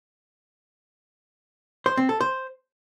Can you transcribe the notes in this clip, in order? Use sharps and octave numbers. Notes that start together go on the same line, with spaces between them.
C5
C4
A4
C5